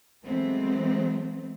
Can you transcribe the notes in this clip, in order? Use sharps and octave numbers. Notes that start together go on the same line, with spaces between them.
E3 F#3 G#3 A3 B3 C4